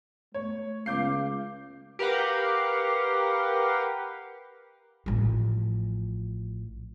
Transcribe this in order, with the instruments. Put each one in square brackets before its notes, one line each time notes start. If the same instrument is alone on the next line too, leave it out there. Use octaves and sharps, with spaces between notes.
[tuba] A3 [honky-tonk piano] C#5
[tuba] C#2 [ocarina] F5 [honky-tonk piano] D6 G6 C7
[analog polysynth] G4 A#4 B4 F5 F#5
[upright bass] A1 F3